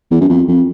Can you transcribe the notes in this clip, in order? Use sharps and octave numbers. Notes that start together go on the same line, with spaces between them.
E2
F#2
F2
F2